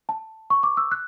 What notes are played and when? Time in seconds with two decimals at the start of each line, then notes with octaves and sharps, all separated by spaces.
0.09 A5
0.50 C#6
0.63 D6
0.77 E6
0.91 F#6